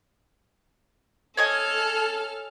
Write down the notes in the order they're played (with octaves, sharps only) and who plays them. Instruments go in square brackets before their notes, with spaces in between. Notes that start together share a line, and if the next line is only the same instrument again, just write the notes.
[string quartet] A4 F6 [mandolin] C#5 D#5 G#5